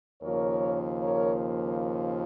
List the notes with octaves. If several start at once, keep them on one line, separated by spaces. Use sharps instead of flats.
D#2 C#3 F3 A#3 A#4 C#5
A#4 C#5